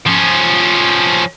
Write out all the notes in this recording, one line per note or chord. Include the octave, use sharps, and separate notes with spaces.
F3 C#4